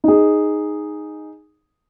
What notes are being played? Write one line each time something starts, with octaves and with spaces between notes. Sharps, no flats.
D#4 G#4